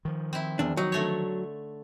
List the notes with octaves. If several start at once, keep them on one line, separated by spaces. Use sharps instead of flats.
D#3 F3
C4 E4
E2 D4
F#3 D#4
D3 A3 C#5